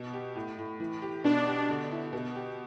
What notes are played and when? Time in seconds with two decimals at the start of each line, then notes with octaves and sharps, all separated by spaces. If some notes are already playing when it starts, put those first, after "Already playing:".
Already playing: B2
0.13 G4
0.35 A2
0.58 A2
0.80 E3
1.02 G4
1.24 B2 D4
1.47 G4
1.69 D3
1.91 E4
2.13 B2
2.35 G4